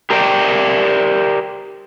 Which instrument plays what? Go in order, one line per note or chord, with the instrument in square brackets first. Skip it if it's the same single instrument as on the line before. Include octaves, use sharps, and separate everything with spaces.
[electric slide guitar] G4 A#4 C5 D5 G5